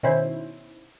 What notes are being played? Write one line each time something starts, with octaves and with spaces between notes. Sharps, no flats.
B2 D#3 C#4 E4 C5